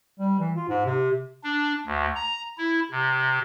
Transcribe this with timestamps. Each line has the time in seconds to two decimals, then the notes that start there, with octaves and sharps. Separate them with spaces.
0.19 G3
0.39 E3
0.56 F4
0.69 G#2
0.86 C3
1.44 D4
1.86 D2
2.15 A#5
2.58 E4
2.91 C3